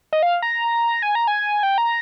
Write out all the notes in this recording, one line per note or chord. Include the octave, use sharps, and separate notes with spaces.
D#5
F5
A#5
G#5
A#5
G#5
G5
A#5